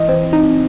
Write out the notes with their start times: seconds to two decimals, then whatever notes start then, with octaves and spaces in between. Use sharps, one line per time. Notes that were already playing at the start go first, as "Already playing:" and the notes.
Already playing: E3 D#5
0.09 C4
0.33 D#4